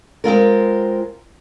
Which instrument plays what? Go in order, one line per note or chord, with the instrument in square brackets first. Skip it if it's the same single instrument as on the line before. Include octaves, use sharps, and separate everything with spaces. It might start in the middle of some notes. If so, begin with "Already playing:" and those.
[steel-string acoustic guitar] G#3 C4 F4 A#4